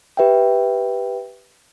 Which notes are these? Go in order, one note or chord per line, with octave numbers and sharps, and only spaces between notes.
G4 B4 E5 G5